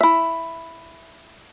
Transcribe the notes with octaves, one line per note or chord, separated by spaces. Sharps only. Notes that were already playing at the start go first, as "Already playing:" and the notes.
E4 E5